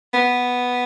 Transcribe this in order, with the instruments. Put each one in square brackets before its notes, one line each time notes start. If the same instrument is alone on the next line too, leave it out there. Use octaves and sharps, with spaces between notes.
[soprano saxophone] B3